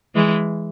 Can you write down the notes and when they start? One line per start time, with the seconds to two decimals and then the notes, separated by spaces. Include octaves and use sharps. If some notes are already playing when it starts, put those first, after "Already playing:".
0.15 E3 G#3